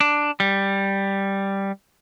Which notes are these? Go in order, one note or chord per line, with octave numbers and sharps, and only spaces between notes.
D4
G3